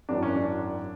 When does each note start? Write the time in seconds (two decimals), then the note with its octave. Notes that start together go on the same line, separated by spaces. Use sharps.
0.09 G#1 F#2 E3 D4
0.23 C#4
0.36 D4